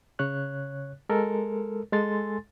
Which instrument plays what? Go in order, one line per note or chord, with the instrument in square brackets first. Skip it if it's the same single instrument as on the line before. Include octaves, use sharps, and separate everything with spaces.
[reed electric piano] C#3 C#5 F#6
G#3 A4 A#4
G#3 A4 G#5 C6 A6